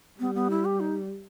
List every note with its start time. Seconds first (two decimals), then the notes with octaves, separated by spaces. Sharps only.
0.20 G3 B3
0.35 B3
0.50 E4
0.65 G4
0.80 D#4